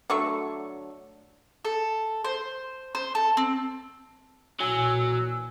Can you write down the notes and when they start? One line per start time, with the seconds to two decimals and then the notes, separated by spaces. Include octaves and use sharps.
0.10 D3 F#3 A3 C#6
1.65 A4
2.24 C5
2.95 C5
3.15 A4
3.37 C4
4.60 B1 A#2 E3 F#3 G#5 E6